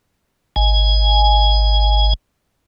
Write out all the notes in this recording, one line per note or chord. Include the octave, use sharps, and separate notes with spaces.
G#1 G#5